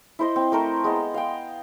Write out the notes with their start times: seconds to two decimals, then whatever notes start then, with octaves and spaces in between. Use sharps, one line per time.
0.19 E4 C5 D#5
0.36 C4
0.52 A3 A#4 C5 C6
0.84 G#3 B3 D#5
1.14 F5 G5